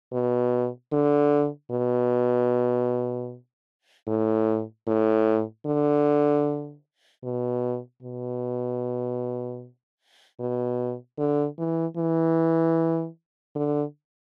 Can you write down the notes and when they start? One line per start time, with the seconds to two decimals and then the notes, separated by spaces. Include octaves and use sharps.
0.13 B2
0.92 D3
1.71 B2
4.08 A2
4.87 A2
5.66 D3
7.24 B2
8.02 B2
10.40 B2
11.19 D3
11.58 E3
11.97 E3
13.55 D3